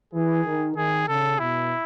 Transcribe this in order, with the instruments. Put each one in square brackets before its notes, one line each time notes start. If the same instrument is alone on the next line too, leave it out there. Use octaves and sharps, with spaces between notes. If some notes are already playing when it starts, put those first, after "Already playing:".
[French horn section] E3 [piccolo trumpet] G#4
[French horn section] D#3
[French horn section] D#3 [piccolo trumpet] G#4
[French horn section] C#3 [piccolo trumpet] A4
[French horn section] B2 [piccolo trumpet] E4